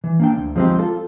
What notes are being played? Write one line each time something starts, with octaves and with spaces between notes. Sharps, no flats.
E3
A#3 D4 G5
D2
F3 G#3 C4 D#4 G4
F4 A4